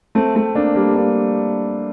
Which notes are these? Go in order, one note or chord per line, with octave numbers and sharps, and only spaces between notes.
A3 C4
A3 C4
A#3 D4
G3 A#3
A#3 D4